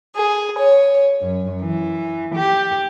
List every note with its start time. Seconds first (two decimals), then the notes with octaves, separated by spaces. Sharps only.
0.15 G#4
0.58 C#5
1.22 F#2
1.62 E3
2.36 G4